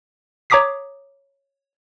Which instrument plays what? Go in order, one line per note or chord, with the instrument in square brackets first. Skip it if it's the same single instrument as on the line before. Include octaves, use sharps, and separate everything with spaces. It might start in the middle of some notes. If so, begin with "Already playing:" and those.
[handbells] C#5 A#5 D6 D#6 B6 C7